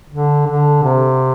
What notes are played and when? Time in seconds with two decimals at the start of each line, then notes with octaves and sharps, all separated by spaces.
0.10 D3
0.47 D3
0.83 C3